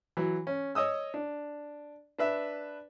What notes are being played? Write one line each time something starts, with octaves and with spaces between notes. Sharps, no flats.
E3 F#3
C#4
C#5 D#5 D#6 E6
D4
D4 B4 E5